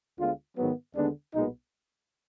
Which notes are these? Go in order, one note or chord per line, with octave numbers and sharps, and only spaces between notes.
D2 D3 G#3 B3 F4
G#2 D#3 F#3 B3
D#2 D3 G#3 B3 D4
B1 A#2 G#3 B3 D#4